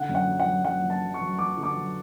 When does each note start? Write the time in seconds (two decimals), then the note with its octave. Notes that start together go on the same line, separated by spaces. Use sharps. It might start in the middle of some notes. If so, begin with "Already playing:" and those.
Already playing: D3 F#5
0.09 F#2
0.15 F#5
0.27 F#3
0.40 F#5
0.46 F#3
0.64 F#3 F#5
0.83 F#3
0.90 A5
1.02 F#3
1.14 C#6
1.21 F#3
1.39 F#3 D6
1.57 D3
1.63 D6
1.76 F#3